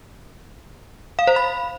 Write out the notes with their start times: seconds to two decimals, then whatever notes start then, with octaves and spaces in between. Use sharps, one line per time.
1.19 F5
1.27 C5
1.36 B5